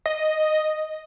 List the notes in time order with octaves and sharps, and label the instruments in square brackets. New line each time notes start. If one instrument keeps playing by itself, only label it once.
[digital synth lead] D#5